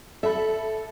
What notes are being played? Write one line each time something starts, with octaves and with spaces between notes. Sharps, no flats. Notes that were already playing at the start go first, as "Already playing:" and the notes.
A4 E5 B5